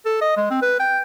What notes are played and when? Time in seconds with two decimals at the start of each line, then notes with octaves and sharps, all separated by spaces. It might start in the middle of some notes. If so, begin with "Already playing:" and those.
0.05 A4
0.21 D#5
0.37 G#3
0.50 C4
0.62 B4
0.80 G5